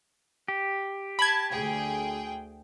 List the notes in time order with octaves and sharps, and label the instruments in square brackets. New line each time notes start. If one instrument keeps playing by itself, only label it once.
[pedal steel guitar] G4
[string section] A5 [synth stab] B5 G#6
[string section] D2 G#4 G5